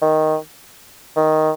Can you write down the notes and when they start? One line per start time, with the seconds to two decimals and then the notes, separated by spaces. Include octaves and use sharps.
0.02 D#3
1.16 D#3